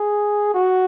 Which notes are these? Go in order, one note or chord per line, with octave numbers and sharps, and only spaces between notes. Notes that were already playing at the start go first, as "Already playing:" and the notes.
Already playing: G#4
F#4